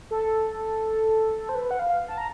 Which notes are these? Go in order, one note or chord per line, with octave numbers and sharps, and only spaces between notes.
A4
C5
B4
F#5
F5
A5
A#5